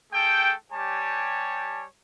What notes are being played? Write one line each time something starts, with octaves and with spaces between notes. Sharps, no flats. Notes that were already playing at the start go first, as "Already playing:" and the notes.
A3 G#4 A4 G5
G3 G4 C#5 G#5 A5